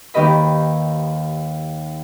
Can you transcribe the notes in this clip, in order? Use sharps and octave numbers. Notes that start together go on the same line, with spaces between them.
D#2 D#3 G4 B4 D#5 B5